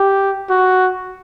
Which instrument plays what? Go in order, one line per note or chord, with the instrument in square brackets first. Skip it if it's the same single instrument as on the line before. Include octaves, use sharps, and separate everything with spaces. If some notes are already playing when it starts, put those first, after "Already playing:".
Already playing: [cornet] G4
F#4